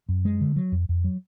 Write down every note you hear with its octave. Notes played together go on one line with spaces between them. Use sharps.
F#2
G#3
D3
F#3
F2
F2
F#3